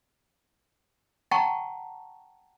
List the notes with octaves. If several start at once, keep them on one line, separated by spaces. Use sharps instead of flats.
F#5 G5 A5 A#5 C#6